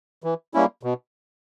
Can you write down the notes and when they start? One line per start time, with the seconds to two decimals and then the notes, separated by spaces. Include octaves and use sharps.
0.24 E3
0.54 G3 A#3 C#4 E4
0.83 B2